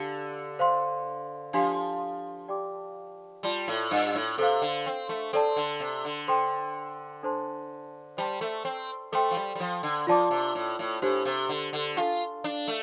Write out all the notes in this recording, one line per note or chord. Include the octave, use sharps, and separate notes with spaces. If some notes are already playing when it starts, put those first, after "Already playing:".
Already playing: D3 D4 G4 F5 A5
C5 F5 C6
F3 D4 G4 F5 C6
G4 D5 G5 D6
G3 F4 D5 A5 C6
A2
G2
A2
C3 A4 C5 F5
D3
C4
A3
C4 A4 D5 A5
D3
C3
D3
A4 C5 G5 C6
D4 A4 C5 A5 C6
G3 C5 A5 C6
A3
C4
A3 A4 C5 G5 C6
F3
G3
G3
F3
D3
F3 F4 D5 A5 D6
C3
A2
A2
A2 D4 G4 C5
C3
D3
D3
D4 F4 A4 F5 A5
D4
A3